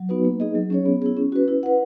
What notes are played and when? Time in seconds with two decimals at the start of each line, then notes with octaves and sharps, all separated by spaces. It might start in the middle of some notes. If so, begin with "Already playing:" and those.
Already playing: F#3
0.09 B3 D#4 F#4 B4
0.25 A#3
0.40 D#4 G#4 D#5
0.55 F#3
0.70 C#4 G#4 C#5
0.86 B3
1.02 E4 G#4
1.17 C#4
1.32 F#4 B4
1.48 E4
1.63 B4 F#5